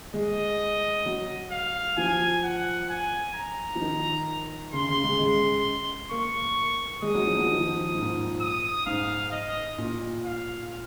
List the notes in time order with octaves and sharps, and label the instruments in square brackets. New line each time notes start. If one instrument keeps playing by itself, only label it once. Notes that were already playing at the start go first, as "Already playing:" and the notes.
[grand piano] G#3 [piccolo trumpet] D#5
[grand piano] F#3
[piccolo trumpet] F5
[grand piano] F3 [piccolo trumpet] G#5
[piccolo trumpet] F#5
G#5
A#5
[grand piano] F3
D#3
[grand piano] C#3 [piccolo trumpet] C6
[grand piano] C#3
G#3
G#3
[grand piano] A#3 [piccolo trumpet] C#6
[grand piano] G#3 [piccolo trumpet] D#6
[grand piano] F#3
F3
F#3
F3
D#3
F3
G#2
A#2
G#2
[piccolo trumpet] D#6
[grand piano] G#2 [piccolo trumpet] F5
[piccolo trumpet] D#5
[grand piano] A#2
[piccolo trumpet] F5